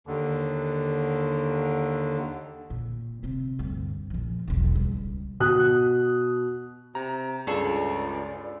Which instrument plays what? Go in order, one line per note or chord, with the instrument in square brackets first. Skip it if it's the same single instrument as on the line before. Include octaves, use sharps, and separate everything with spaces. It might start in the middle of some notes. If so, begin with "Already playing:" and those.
[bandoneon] D#2 D3
[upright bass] A#2
C3 C4
D2 G2
A#1 F3
E1 B1
C#2 G3
[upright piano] B2 D#6 F#6
[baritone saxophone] C3 [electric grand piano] A#5
[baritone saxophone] C#2 [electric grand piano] G2 F4 [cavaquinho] G#4 A4 C#5 [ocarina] D5